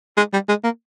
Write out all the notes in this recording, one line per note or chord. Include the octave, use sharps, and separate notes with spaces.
G#3
G3
G#3
A#3